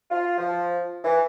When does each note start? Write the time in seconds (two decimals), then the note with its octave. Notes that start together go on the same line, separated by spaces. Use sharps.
0.09 F4
0.37 F3
1.03 E3